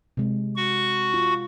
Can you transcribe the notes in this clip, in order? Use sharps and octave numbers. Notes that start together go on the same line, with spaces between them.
C3 G#3
F#4 C#6
F4